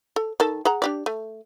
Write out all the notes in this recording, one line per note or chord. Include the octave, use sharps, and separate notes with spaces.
A4
D#3 A4 A5
G#4 F#5 A#5
D4 G4 D5
A3